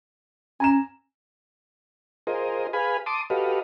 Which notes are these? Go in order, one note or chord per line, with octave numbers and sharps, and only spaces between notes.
C#4 G#5 A#5 E7
F4 G#4 A#4 C5 D#5
G#4 B4 F5 G#5 B5
A5 C6 D6 D#6
F#4 G4 A4 B4 D#5 F5